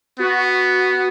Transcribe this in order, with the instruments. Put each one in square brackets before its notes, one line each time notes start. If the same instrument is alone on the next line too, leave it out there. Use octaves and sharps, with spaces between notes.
[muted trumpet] B3 [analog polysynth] F#4